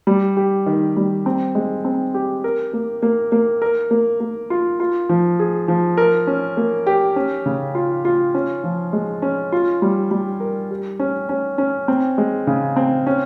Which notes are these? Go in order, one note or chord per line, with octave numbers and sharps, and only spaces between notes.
G3
G4
D#3
G3
C4
G#3
C4
G4
A#4
A#3
A#3
A#3
A#4
A#3
A#3
F4
F4
F3
G#4
F3
A#4
C#4
A#3
G4
C#4
C#3
F4
F4
C#4
F3
G#3
C#4
F4
G3
G3
A#4
G4
C#4
C#4
C#4
C4
G#3
C#3
C4
C#4